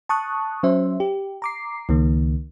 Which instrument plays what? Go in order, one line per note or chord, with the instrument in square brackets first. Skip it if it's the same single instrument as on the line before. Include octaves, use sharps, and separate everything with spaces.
[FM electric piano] A5 C#6 D#6 F#6
F#3 C#4 C5 E5
G4
A#5 D6 C7
C#2 D#3 A#3